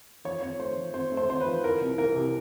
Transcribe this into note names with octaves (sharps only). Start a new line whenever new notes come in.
F3 C#5
G#1 C#5
A3 C5
F3
G#1 C5
A3
C5
G#1 C5
B4
F3
E3 A#4
C2
E3 A#4
C3